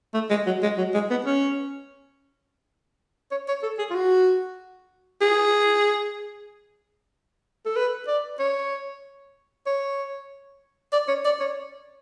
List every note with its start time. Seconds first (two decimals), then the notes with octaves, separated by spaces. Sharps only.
0.14 A3
0.30 G#3
0.46 F#3
0.63 G#3
0.78 F#3
0.94 G#3
1.10 B3
1.26 C#4
3.32 C#5
3.48 C#5
3.63 A4
3.79 G#4
3.91 F4
3.95 F#4
5.21 G#4
7.66 A4
7.76 B4
8.08 D5
8.39 C#5
9.67 C#5
10.93 D5
11.08 C#5
11.25 D5
11.40 C#5